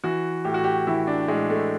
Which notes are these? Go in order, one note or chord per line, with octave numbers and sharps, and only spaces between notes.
E3 F#4
A2 G4
F#4
G4
E3 E4
D4
A2 G#3
A3